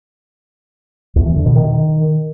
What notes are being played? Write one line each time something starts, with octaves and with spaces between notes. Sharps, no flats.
E2
E3
D3
B2
D#3